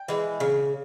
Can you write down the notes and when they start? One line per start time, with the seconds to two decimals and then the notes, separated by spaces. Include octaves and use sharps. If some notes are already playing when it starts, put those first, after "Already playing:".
Already playing: G5
0.08 E3 G#3
0.40 C#3